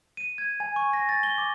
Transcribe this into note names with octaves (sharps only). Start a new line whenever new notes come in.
D#7
G#6
G#5
C#6
A#6
A6
G7
D6